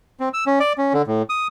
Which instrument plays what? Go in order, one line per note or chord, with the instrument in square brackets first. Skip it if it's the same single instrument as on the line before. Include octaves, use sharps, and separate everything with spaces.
[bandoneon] C4
E6
C#4
D5
C#4
D3
A2
D#6